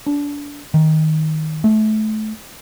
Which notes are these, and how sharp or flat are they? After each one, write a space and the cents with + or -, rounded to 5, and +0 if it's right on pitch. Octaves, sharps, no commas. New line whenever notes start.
D4 -25
D#3 +10
A3 -25